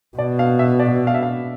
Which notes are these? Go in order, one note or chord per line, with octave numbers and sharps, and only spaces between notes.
B2 D5
F5
E5
D5
F5
E5
F5